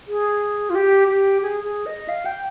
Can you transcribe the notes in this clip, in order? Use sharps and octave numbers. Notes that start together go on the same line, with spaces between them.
G#4
F4
G4
G4
G#4
G#4
D#5
F5
G5